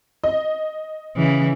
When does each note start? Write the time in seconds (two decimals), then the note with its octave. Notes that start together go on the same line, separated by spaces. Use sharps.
0.24 D#5
1.16 C#3 E3